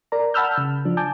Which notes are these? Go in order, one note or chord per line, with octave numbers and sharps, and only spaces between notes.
A#4 D5 A#5
F#5 A5 B5 E6 F6 G6
C#3
F3 D4
G#5 A5 D6 G6